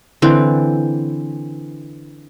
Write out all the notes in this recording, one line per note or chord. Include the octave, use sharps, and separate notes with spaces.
D3 E3 C4